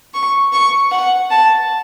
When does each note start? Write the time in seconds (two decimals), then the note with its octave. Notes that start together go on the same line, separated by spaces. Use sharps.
0.14 C#6
0.53 C#6
0.91 F#5
1.31 A5